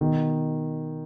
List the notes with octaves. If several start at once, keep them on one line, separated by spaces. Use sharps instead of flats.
B2 D#3